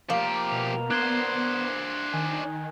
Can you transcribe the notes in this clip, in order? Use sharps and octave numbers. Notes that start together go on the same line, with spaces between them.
F3 A#3 G4
B2 F7
B3 D4 C5 F#6 G#6 G7
D#3 G#5